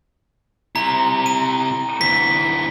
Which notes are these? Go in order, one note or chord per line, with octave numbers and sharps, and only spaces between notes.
C3 E4 A#5
D#7
D2 E3 B6